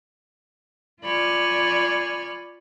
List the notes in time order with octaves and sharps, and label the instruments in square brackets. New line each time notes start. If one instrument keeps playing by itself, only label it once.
[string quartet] F4 D5 G#5 B5 C#6 F6